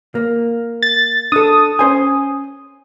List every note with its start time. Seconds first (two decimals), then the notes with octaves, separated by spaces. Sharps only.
0.15 A#3
0.83 A6
1.32 D4 A4 D#6
1.79 C#4 C5 G#5